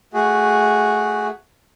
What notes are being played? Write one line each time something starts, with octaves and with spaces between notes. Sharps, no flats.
A3 F#4 G#4